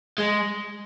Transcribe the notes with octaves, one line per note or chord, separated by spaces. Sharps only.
G#3